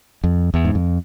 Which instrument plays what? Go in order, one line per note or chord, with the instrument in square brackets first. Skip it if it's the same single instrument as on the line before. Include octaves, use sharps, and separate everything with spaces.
[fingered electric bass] F2
E2
G#2
F2